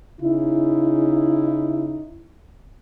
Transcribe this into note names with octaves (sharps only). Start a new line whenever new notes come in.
C#3 D#4 E4